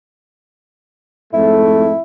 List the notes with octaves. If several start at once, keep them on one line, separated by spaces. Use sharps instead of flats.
F2 G#2 A3 E4